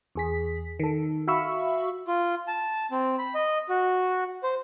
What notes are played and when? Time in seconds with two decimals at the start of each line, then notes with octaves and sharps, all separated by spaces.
0.15 E2 G#4 B6
0.80 D#3 A4
1.27 F#4 E5 F5 B5 C#6 E6
2.08 F4
2.48 A5
2.91 C4
3.19 B5
3.35 D#5
3.69 F#4
4.43 C5